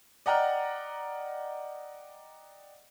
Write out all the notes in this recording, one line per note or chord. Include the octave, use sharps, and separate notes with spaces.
D5 D#5 F#5 G5 A#5 F6